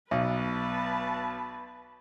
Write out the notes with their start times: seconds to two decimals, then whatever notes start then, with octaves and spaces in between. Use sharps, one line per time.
0.11 B1 B4 A5